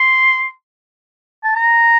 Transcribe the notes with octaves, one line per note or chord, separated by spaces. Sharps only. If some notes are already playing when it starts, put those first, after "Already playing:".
Already playing: C6
A5
A#5